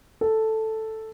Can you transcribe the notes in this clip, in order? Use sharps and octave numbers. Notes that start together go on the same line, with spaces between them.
A4